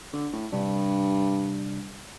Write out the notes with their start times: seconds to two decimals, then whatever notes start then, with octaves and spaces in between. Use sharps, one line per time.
0.13 D3
0.33 A2
0.52 G2 C3 G3 D4